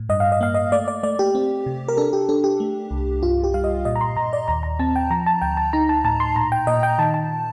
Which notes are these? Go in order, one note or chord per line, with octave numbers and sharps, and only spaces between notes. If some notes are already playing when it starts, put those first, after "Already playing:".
Already playing: A2
G2 D#5
F5
D#5
A#3 F5
D#5
A3 D5
D5
A3 D5
G4
C4
C3
A#4
D4 A4
G4
D4 A4
G4
A3
C2
G2 F4
G4
G3 F5
D#5
A#2 D#5
A#5
C6
A#2 A#5
D5
D#2 A#5
A#5
C4 A5
G5
F3 A#5
A5
D2 G5
A5
D#4 A#5
A5
A2 A5
C6
A#2 A#5
G5
A#2 D#5
G5
D#3 A5
A5